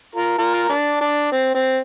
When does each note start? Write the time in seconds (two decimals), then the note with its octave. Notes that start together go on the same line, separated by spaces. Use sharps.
0.15 F4 A#4
0.38 F4 A#4
0.69 D4
1.01 D4
1.32 C4
1.55 C4